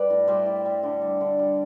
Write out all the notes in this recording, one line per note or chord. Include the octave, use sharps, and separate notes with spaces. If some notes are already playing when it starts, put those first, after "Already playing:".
Already playing: G3 B4 D5
A2
G3 C5 E5
A2
G3
D3
G3
D3
G3